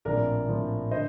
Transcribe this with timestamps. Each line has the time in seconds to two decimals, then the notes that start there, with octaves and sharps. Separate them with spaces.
0.05 A#1 A2 F3 C4 A#4 D5
0.48 A#1 A2 F3 C4
0.91 D3 C5 D#5